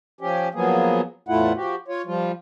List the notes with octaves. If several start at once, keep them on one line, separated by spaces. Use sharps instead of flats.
F3 C#4 G4
F3 F#3 A#3 B3 G#4
E2 A2 A3 E4 F4 F#5
F3 F#4 G4
F4 C#5
F3 G3 F4